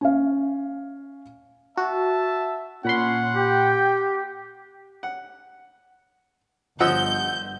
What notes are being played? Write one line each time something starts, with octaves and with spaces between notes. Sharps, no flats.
C#4 F5
F#4 E5 A5
A#2 C#4 F#5 B5 C6
G4 G5
F#5
G1 F3 D#5 F#5 E6 G6